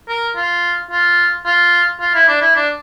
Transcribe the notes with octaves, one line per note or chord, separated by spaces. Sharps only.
A#4
F4
F4
F4
F4
E4
D4
E4
D4